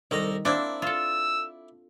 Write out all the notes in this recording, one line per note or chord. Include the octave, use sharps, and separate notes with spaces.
C2 D#3 A4 A#5
A#3 C4 D4 E4 D5
F4 A4 E6